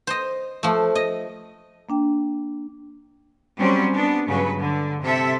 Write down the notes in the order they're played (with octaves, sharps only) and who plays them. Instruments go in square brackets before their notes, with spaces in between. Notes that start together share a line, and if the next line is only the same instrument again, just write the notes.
[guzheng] C5 D#5
F3 A3
D#5
[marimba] A#3 D4 G5
[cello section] F#3 G3 C4 C#4
B3 D4
G2 C#3 F#3 B4
D3
C3 A4 E5